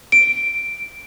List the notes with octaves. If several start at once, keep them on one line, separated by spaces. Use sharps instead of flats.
D7